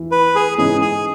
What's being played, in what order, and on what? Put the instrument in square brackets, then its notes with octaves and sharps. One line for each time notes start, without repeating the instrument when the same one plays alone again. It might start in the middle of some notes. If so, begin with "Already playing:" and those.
Already playing: [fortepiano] E2 E3 E4
[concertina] B4
G#4
[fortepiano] G#2 E3 C#4 [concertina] G#4
[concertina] G#4